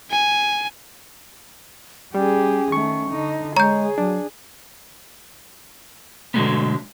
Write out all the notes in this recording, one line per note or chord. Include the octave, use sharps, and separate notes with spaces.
G#5
G3 C#4 G4 G#4
D#3 A3 C#6
D3 D#4
G#3 G#4 C#5 A#5 G6
F#3 D4
B2 D3 F#3 G#3 A3 B3